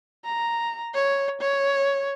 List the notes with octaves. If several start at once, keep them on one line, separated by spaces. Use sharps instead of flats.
A#5
C#5
C#5